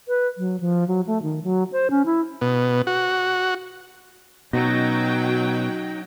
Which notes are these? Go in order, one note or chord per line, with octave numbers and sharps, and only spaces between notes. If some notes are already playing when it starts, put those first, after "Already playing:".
B4
F#3
F3
F#3
A3
D#3
F#3
C5
C#4
E4
B2
F#4
B2 F#3 C#4 D#4 G5